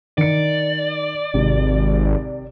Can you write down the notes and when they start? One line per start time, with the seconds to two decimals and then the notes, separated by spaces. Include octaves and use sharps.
0.18 D#3 D5 C#7
1.34 G#1 C3